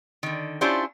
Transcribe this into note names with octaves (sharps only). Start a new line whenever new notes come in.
D3 D#3
C#4 D4 E4 F4 G4 C5